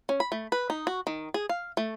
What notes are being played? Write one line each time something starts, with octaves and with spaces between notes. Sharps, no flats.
C#4
B5
A3
B4
D#4
F#4
D#3
G#4
F5
A3